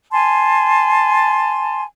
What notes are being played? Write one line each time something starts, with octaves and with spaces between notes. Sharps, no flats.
G#5 A5 C6